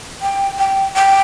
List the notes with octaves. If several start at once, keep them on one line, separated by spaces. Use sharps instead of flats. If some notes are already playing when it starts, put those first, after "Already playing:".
G5
G5
G5